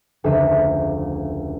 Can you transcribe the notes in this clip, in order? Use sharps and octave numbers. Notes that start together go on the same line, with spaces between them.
F1 D2 C#3 E5 B6 D#7